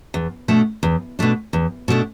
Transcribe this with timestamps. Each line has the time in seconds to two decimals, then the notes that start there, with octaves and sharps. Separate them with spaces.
0.14 E2
0.48 B2 A3 D4
0.83 E2
1.19 B2 A3 D4
1.53 E2
1.88 B2 A3 D4